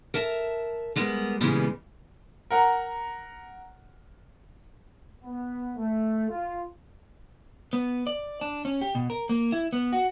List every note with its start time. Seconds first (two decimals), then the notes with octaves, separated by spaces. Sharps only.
0.14 A#4 E5 A5
0.96 G3 G#3 B3 A#4
1.41 A#2 C#3 E3 G3 G#3 B3
2.50 A#4 F#5 A#5
5.24 B3
5.77 A3
6.30 F4
7.73 B3
8.07 D5
8.41 D4
8.65 C#4
8.81 G4
8.95 B2
9.10 A#4
9.29 A#3
9.52 E4
9.73 B3
9.92 F#4